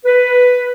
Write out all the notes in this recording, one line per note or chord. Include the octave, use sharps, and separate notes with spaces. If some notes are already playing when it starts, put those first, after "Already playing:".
B4